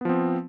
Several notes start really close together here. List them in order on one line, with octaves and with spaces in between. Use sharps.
B3 F3 C4